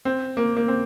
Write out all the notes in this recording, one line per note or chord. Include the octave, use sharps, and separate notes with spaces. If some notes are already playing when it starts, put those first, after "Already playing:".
C4
A#3
A#3
C4